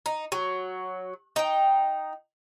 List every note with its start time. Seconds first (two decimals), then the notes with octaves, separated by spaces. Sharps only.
0.06 D#4
0.32 F#3
1.36 D#4 G5